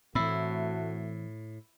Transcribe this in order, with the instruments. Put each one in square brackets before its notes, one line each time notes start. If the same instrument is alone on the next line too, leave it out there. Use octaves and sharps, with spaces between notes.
[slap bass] A2 [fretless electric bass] E3 C4 [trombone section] A3 F#4 [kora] E4